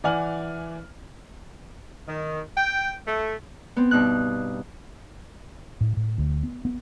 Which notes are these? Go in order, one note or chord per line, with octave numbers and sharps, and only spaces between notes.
E3 D5 F#5 G#5 F6 F#7
D#3
G5
A3
B3 C4
G2 B2 D#4 F#6
A2
A2
D2
B3
B3